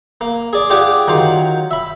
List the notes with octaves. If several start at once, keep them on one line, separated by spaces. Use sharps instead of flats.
A#3
G#4 D5
F4 G4 G#4 D5 F#5 G5
D#3 F#3 F4 G5 C6
E5 B5